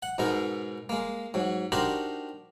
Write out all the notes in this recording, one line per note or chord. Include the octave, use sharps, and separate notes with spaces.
F#5
G#2 B2 G#3 D#4 A#4
G#3 A#3
G#2 F#3
D4 D#4 F#4 G4 A#4 C5